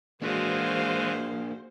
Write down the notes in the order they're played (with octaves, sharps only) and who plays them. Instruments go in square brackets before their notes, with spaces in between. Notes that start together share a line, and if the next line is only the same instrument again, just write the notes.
[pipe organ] E3 G#3 [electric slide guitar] A#3 D4 [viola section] F#4 C5 [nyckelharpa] G#4 F5